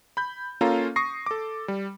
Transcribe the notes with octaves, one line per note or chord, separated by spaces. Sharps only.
B5 G6
A#3 C#4 F4 A4 F5 A#5
C#6 D#6 A#6 C7
A4 D6
G3